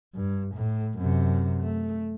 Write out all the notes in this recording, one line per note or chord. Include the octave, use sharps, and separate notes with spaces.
G2
A2
F#2 C3
A3